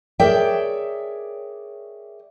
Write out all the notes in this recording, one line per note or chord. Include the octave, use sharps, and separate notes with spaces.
G#4 A#4 C#5 D5 E5 G5